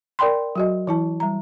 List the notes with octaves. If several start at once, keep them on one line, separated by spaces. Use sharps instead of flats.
A#4 D5 G5 B5 C6
F#3 F#4 D#5
E3 E4 A5
G3 A#5